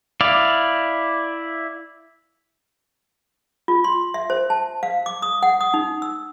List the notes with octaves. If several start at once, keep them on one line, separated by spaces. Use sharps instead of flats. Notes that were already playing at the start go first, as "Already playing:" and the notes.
E4 D5 F5
F4
C6
E5
C5
A5
F5
D6
D#6
F#5
D#6
D#4
E6